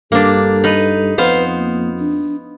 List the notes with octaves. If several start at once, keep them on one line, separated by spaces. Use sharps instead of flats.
G2 A#3 D4 A4
D#4 B4
F2 B3 B4 C5 F5
A#3
D4